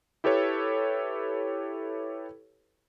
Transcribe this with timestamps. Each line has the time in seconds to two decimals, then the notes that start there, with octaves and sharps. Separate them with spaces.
0.24 E4 G4 A4 B4 C#5